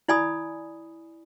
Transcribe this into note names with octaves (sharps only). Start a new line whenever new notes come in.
E4 D5 G#5 B5 D#6